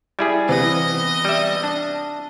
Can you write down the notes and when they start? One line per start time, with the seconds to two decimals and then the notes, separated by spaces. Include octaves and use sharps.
0.19 G3 E4 G#4 G#6
0.49 C3 E3 B3 D#5
1.25 G3 E5
1.63 D4